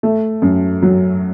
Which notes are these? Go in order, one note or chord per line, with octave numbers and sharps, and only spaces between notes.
A3
F#2
F#3